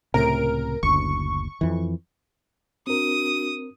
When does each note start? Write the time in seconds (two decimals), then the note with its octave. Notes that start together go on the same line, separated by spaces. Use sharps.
0.14 C#2 A2 C3 A#4 D7
0.83 F#1 D2 C#6
1.61 F2 E3
2.87 C4 D4 F#4 A#4 D#6